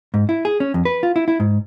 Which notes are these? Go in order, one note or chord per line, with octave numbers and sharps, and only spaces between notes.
G#2
E4
G#4
C#4
F2
B4
F4
E4
E4
G#2